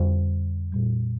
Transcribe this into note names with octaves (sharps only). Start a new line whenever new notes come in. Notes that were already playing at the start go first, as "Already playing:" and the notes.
Already playing: F2 D3 G3 C5
A#2 G3